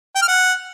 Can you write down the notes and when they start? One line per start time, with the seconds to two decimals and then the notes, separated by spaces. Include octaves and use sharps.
0.16 G5
0.22 F6
0.28 F#5